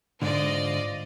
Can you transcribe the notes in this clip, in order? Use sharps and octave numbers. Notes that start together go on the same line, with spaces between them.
G#2 D3 F4 D5 D#5